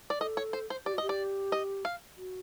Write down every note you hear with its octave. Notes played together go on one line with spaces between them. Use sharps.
D5
A4 D#5
C#5
C5
C5
G4 D5
F#4
G4 D#5
D5
D#5
F5
F#4